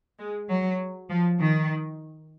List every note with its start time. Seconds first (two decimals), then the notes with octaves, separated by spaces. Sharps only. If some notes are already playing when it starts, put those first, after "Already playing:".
0.19 G#3
0.49 F#3
1.10 F3
1.39 D#3